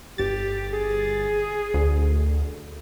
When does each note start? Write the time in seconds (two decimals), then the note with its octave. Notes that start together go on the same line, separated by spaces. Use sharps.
0.18 G1 G4 A6
0.73 G#4
1.74 D2